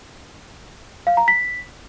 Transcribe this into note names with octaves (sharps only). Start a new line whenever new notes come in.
F5
A#5
B6